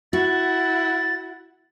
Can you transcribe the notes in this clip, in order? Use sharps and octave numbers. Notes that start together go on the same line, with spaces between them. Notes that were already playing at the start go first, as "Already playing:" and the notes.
E4 F#4 F#5 A6